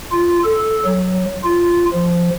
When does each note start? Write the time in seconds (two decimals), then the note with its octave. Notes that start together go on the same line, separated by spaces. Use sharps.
0.12 F4
0.44 A4
0.85 F#3
1.44 F4
1.93 F3